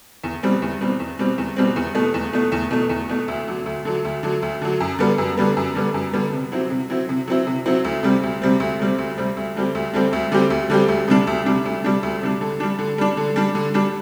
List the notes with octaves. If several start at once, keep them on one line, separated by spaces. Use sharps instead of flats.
E2
B2 G3 C4
E2
B2 G3 C4
E2
B2 G3 C4
E2
B2 G3 C4
E2
B2 A3
E2
B2 A3
E2
B2 A3
E2
B2 A3
D2
D3 F#3
D2
D3 F#3
D2
D3 F#3
D2
D3 F#3
F#2
D3 G3 B3
F#2
D3 G3 B3
F#2
D3 G3 B3
F#2
D3 G3 B3
C3
F#3 C4 E4
C3
F#3 C4 E4
C3
F#3 C4 E4
C3
F#3 C4 E4
D2
C3 G3 C4
D2
C3 G3 C4
D2
C3 G3 C4
D2
C3 G3 C4
D2
D3 G3 C4 G4
D2
D3 G3 C4 G4
D2
D3 G3 C4 G4
D2
D3 G3 C4 G4
D2
C3 G3 D4
D2
C3 G3 D4
D2
C3 G3 D4
D2
C3 G3 D4
D3
G3 D4
D3
G3 D4
D3
G3 D4
D3
G3 D4